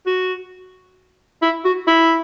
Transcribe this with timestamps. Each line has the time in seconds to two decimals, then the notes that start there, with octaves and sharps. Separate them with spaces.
0.06 F#4
1.42 E4
1.65 F#4
1.87 E4